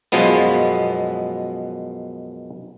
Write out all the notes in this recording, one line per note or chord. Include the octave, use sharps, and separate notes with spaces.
F#2 B2 F3 G#3 B3